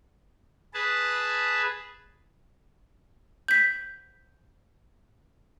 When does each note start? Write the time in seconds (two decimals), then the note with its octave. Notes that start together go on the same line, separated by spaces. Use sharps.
0.74 G#4 B4 A5
3.48 G6 B6